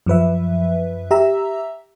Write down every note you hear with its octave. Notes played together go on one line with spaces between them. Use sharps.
F#2 F3 B4 E5
G4 E5 A#5 E6